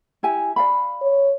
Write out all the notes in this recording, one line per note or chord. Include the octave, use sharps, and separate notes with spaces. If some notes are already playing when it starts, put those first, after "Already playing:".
E4 G4 G#5
D5 F5 B5
C#5